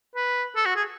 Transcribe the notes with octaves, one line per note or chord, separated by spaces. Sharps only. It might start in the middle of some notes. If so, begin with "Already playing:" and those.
B4
A4
F#4
G#4